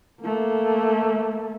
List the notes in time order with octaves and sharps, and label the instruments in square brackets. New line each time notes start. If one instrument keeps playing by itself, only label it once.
[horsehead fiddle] A3 A#3